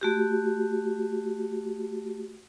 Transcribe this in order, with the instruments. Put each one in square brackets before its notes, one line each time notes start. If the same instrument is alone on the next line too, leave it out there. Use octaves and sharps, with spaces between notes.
[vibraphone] A3 F#4 G4